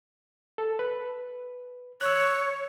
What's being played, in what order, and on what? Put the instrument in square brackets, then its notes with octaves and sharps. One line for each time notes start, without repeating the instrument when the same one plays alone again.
[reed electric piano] A4
B4
[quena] C#5 [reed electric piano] E6 F#6